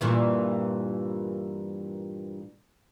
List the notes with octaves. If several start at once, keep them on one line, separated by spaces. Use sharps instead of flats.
G2 A#2 E3